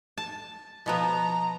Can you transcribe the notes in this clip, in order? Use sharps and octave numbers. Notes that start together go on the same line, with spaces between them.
A5
B2 F3 B3 A#5